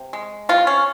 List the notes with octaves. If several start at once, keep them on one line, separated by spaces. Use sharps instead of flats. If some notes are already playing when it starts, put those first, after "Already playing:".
Already playing: C3
G#3
C3 F4
C#4